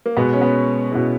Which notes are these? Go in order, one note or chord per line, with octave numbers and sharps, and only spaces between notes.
A#3
B2 G#3 B3
C#4
B3
B2 G#3 C#4 E4